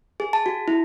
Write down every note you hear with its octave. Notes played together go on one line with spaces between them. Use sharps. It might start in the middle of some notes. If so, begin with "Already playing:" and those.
G#4
A5
F#4
E4